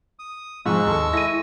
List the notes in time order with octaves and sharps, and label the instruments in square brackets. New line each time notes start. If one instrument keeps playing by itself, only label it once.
[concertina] D#6
[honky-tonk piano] G#2 [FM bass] F3 [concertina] G#3 C#6 E6
[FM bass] D#2 [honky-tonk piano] A4
[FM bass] E4 [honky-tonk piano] A#6 D#7